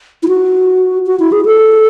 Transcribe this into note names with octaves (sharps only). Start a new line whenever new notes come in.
E4
F#4
F#4
E4
G#4
A4